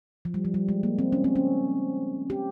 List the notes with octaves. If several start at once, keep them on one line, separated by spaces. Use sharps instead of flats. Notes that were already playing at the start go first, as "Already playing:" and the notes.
F3
G3
F3
G3
G#3
A#3
C4
C#4
C4
C#4
G4